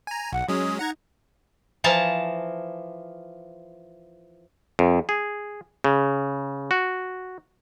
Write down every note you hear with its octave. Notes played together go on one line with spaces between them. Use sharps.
G#5 A#5
B1 F#5
F#3 G#3 C#4 D#6
D#4 F#5 A#5 G#6
E3 F3 F5 A5 A#5
F2
G#4
C#3
F#4